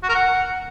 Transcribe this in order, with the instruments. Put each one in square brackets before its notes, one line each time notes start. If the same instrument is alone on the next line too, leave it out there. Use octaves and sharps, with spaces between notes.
[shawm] F#4
A#4
F#5